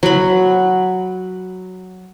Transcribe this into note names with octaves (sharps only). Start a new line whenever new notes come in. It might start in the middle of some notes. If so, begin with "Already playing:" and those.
F#3 B5